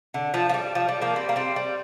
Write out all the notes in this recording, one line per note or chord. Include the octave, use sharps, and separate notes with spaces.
D3
F3
F3
G3
F3
G3
F3 A#3
G3 C4
A#3
G3 C4
G3